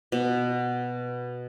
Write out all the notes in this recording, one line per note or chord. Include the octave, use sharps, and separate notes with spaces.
B2